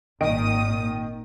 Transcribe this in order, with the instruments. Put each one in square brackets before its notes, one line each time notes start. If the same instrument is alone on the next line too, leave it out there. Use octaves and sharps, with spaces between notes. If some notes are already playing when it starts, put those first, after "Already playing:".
[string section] G#1 A#2 D#6 [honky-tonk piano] D#3 D#5 D7